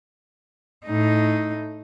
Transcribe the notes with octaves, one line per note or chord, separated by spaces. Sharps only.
A2 D#4